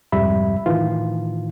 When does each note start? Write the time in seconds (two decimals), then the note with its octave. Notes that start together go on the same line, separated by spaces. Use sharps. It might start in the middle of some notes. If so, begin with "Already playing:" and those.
0.12 C2 F2 G#2 G3 E5 B5
0.66 A2 D#3 E3 F4